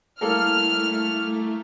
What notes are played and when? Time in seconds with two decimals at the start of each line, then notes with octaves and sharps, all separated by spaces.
0.21 G3 A3 A#3 E4 A4 F6